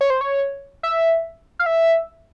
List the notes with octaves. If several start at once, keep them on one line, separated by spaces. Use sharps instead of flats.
C#5
C5
C#5
E5
F5
E5